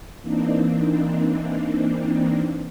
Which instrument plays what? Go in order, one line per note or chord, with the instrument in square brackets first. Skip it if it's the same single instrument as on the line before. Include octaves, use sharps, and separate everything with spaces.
[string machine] E3 A#3 C4 D4 D#4